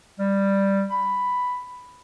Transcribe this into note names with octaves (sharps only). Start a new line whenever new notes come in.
G3
B5